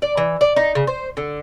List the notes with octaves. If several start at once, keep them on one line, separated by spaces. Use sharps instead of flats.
D5
E3
D5
D#4
C#3
C5
D3